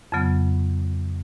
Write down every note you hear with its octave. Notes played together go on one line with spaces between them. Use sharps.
F2 C#3 F#3 B3